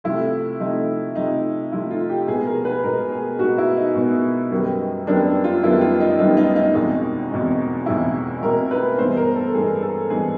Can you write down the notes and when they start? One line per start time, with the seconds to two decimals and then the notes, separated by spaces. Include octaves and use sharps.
0.04 C3 F3 A3 E4
0.60 C3 F3 A3 D#4
1.16 C3 F3 A3 D#4
1.72 C3 F3 A3 E4
1.91 F4
2.10 G4
2.27 B2 G#3 B3 G#4
2.46 A#4
2.65 B4
2.83 B2 G#3 B3 A#4
3.12 G#4
3.39 B2 G#3 B3 F#4
3.58 E4
3.76 D#4
3.95 B2 G#3 B3
4.51 F#2 D#3 G3 B3
5.07 F#2 D#3 G3 B3 D4
5.44 F4
5.63 F#2 D#3 G3 B3 E4
5.81 F4
6.00 D#4
6.19 F#2 D#3 G3 B3 D#4
6.37 D#4
6.56 D#4
6.75 E2 B2 G#3 C4 D#4
7.31 E2 B2 G#3 C4
7.86 E2 B2 G#3 C4 E4
8.42 E2 B2 G#3 C4 A#4
8.71 B4
8.98 G2 E3 G#3 B3 C5
9.17 A#4
9.36 A4
9.54 G2 E3 G#3 B3 G#4
9.83 A4
10.10 G2 E3 G#3 B3 G#4